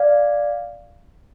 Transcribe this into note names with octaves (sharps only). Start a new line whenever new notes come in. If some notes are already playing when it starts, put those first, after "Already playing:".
Already playing: D5 F5